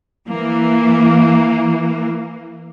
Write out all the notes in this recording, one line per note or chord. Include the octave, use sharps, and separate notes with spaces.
E3 A#3